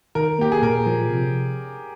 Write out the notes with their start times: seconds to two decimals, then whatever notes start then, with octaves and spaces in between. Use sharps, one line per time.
0.15 D#3 A#4
0.39 A#3 G4
0.52 G#4
0.62 A#2 A#4
0.86 F3
1.10 C3